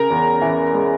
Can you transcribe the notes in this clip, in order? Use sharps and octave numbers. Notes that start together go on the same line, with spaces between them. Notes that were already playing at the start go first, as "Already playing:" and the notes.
Already playing: C#3 A#4 A#5
E2
E3
G#3